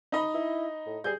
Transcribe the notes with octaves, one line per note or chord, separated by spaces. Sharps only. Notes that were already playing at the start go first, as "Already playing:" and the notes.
D#4 D#5 B5
E4
A2
G3 G#4 G6